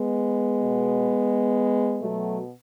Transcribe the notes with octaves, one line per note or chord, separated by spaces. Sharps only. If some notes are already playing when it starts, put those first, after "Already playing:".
Already playing: G#3 B3
B2
B2 F#3 A3